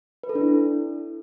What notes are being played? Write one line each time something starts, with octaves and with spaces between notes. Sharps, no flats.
B4
A4
D4
E4